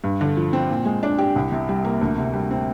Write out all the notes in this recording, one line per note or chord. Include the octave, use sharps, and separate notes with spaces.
G2
D3
F3
C4
A#2
G#3
D4
G4
C2
C3
G3
A#3
D2
C3
G3
C4